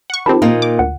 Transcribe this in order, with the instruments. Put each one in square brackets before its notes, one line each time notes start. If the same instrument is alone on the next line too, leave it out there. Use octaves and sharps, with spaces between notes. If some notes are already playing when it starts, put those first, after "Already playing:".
[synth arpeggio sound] F#5 C#6
[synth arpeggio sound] D#3 F3 C4 [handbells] G4 A5 B5
[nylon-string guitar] A#2 A#3 D#4
[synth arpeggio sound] D6
[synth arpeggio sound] D2 [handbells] F#5